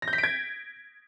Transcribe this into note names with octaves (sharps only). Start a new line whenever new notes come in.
A#6
G6
B6
D7
G#6